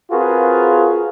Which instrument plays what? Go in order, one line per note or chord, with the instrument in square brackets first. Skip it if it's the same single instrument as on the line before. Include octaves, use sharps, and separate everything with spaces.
[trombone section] C4 F4 F#4 G#4 A#4 B4